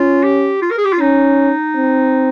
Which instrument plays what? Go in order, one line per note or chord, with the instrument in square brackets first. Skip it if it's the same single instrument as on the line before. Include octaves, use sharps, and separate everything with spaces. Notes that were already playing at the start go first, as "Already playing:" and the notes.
Already playing: [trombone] C#4 [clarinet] F4
[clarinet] G4
F4
A#4
G#4
G4
F4
[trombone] C#4 [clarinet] D#4
[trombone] C4